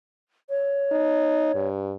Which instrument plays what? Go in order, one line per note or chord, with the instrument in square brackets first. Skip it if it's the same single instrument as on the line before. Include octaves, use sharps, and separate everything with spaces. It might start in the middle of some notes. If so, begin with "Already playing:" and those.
[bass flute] C#5
[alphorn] D#4
G2